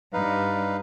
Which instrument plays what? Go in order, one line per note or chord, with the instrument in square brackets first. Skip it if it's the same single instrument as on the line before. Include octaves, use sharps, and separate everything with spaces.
[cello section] G2 D4 [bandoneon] D#4 B4 F5